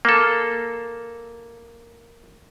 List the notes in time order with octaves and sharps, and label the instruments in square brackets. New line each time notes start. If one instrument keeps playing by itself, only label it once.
[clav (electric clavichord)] A#3 A4